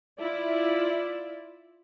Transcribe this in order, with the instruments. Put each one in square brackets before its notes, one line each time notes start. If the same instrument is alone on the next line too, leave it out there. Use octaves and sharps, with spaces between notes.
[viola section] E4 F4 D5 E5